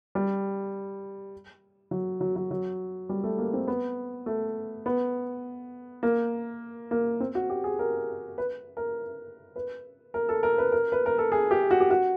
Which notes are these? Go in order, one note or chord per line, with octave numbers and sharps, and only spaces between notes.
G3
F#3
F#3
F#3
F#3
G3
A3
A#3
C4
B3
A3
B3
A#3
A#3
C4
F#4
G4
G#4
A#4
B4
A#4
B4
A#4
A4
A#4
B4
A#4
B4
A#4
A4
G#4
G4
F#4
G4
F#4